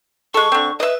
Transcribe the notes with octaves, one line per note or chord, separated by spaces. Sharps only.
G#3 A4 C#6
D3 C4
B4 D#5 E5